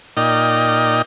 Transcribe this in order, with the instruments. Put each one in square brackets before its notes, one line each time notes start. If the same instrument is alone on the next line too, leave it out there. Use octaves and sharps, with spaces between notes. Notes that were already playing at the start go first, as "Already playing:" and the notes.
[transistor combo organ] A#2 D#4 D5 D#5 G5 F6